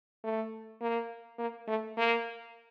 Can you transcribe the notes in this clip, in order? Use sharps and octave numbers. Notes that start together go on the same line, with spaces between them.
A3
A#3
A#3
A3
A#3